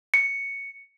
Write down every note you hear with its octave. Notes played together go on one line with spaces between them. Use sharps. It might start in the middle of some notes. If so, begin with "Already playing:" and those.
C#7